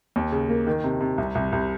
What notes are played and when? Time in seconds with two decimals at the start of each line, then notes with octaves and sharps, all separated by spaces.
0.16 D#2
0.32 C#3
0.49 A#3
0.67 D#3
0.84 C3
1.01 C3
1.18 C2
1.35 C2
1.52 C2